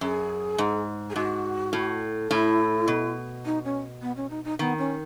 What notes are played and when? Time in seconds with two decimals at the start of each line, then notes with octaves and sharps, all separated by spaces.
0.01 F#2 G#4
0.58 G#2
1.10 G#4
1.16 G#2 F#4
1.73 A2
2.31 A2 E4
2.88 B2
3.45 D#4
3.65 C#4
4.02 B3
4.16 C#4
4.30 D#4
4.45 D#4
4.59 D#3 B3
4.78 C#4